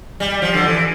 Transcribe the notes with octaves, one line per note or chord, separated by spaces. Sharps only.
G3
F3
D3
E3